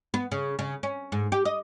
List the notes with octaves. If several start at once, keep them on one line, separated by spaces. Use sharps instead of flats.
B3
C#3
C#3
C#4
G#2
G4
D#5